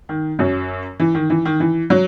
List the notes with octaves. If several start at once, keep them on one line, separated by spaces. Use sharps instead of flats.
D#3
F#2 F#3
E3
D#3
E3
D#3
E3
F#3